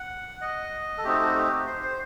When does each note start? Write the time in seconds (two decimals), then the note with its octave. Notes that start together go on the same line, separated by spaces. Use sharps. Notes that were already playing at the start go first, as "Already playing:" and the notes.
Already playing: F#5
0.41 D#5
0.98 A4
1.04 A3 C4 D#4 F#4 G4
1.20 F#4
1.35 G4
1.67 C5
1.83 C5